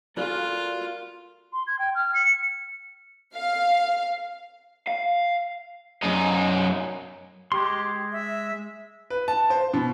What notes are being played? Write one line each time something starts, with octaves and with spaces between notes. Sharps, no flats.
F4 F#4 A4 A#4 D5 F#6
C6
G#6
G5
F6
C#7
F5
F5
F#2 D#4
G#3 G4 C6
E5
B4
A5
C5
B2